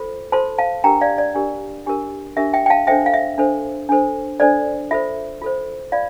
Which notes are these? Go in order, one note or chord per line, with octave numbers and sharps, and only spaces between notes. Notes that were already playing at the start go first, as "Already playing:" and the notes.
Already playing: F4 A4 C5
F4 A4 C5 A5 C6
F5 A5
D4 G4 A#4 G5 A#5
D5 F5
D5
D4 G4 A#4
D4 G4 A#4
D4 G4 A#4 E5
E5 G5
G5
F5 A5
D4 A4 C5 E5 G5
F5
E5
D4 A4 C5
D4 A4 C5
D4 A4 C5 D5
F4 A4 C5 E5
F4 A4 C5
F4 D5 F5